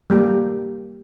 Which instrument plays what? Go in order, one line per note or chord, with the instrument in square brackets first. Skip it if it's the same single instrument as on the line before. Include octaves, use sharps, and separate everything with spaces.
[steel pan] G3 A#3 G4